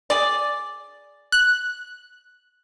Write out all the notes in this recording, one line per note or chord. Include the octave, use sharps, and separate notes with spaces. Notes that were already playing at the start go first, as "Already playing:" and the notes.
G#4 D5
F#6